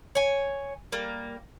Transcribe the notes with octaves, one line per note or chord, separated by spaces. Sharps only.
C#5 G#5
G3 A#3